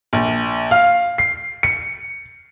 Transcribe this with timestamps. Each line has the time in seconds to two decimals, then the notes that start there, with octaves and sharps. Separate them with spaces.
0.13 A#1
0.71 F5
1.18 C7
1.63 C#7